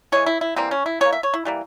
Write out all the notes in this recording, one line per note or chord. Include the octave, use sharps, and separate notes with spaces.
E3 G#3 C#5
E4
E4
E3 G3 A#3 C4
C#4
E4
E3 G3 A#3 C#5
E5
C#5
E4
E3 G3 A#3